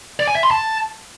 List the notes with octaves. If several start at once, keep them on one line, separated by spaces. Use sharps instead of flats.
D5
G#5
E5
C6
A5